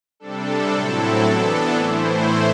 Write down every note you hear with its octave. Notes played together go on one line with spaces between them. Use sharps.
C3 G3 D4 A4
A2 F#3 C4 E4 A4
E3 B3 D4
A2 E3 A3 E4 C5